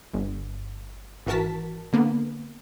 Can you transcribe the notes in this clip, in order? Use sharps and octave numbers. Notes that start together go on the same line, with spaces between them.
G1
G#1 E3 F#4 A#4 A5 B6
D3 A#3 B3